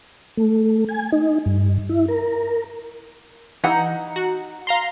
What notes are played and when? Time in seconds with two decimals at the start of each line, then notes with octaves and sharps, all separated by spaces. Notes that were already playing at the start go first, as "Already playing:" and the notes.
0.37 A3
0.89 G#5
1.12 D#4
1.46 G2
1.89 E4
2.08 A#4
3.64 E3 D#4 F#5 A#5
4.16 F#4
4.67 F5 A#5 C6